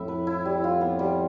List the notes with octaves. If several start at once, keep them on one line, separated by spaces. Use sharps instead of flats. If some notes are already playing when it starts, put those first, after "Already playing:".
Already playing: F2 A2 E4 E5
B4
E4
G3
F4
B3
G3